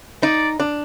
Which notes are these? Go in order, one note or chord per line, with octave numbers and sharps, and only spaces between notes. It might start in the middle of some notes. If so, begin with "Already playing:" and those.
D#4 D5
D4